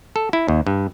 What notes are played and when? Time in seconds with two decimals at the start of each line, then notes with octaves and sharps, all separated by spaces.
0.16 A4
0.33 E4
0.48 D#2
0.67 G2